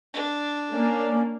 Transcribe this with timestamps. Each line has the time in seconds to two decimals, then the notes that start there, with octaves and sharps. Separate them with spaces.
0.14 D4
0.72 A#3 C#4 D5